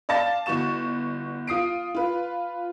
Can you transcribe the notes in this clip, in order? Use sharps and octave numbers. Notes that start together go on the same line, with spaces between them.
D5 F5 A5 A6
G1 E4 F#4 C#6 E7
F4 D#6 C7 D7
F4 B4